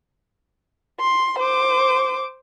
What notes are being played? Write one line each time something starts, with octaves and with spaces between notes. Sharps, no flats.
C6
C5 D6